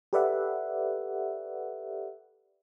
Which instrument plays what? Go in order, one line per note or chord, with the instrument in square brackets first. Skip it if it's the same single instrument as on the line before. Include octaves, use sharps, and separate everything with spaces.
[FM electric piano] G4 A4 B4 D5 E5 F#5